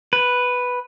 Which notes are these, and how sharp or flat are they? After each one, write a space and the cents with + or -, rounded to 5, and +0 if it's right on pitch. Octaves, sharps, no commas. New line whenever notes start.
B4 +0